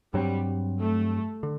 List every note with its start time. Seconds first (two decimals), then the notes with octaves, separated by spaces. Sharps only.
0.13 G2 F#3 G3 C4
0.78 A3
1.43 D3